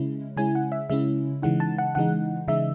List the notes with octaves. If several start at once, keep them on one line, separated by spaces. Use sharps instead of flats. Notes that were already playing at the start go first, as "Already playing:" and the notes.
Already playing: C#3 G#3 C#4 E4
C#3 G#3 C#4 E4 G#5
F#5
E5
C#3 G#3 C#4 E4 E5
C#3 E3 G#3 D#4 F#5
A5
F#5
C#3 E3 G#3 D#4 F#5
C#3 E3 G#3 D#4 E5